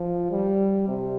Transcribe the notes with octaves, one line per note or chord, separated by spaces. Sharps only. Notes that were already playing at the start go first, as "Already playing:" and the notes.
Already playing: F3
G3
C3